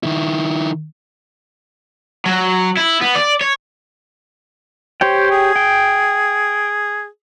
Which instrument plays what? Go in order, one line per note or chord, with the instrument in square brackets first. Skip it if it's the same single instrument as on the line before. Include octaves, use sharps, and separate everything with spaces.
[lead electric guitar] D#3 E4
[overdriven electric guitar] F#3
E4
B3
D5
C#5
[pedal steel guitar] G4 C#5 G5 [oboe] C5
[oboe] G#4
[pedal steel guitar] G5